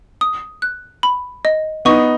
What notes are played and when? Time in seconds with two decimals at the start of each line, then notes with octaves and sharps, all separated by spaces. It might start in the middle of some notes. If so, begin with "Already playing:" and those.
0.21 D#6
0.62 F#6
1.03 B5
1.45 D#5
1.85 B3 D#4 C#6